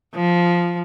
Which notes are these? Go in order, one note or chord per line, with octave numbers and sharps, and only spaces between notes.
F3